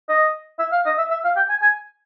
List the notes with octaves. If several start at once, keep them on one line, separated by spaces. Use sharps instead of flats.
D#5
E5
F5
D#5
E5
E5
F5
G5
G#5
G#5